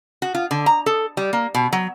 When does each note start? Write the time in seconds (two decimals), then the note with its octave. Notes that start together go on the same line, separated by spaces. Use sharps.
0.22 F#4
0.35 F4
0.51 D3
0.66 A#5
0.86 A4
1.17 G3
1.33 A#3
1.55 B2
1.72 F#3